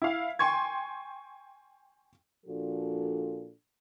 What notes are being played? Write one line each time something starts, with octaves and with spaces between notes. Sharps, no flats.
E4 F5
G5 G#5 C6 C#6 G#6
A#2 F3 D4 F#4 A4